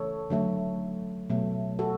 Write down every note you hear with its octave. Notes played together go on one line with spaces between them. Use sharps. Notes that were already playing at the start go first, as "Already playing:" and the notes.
Already playing: C#3 E3 A3 A4 C#5
D3 F#3 A3
B2 F#3 A3
F#4 A4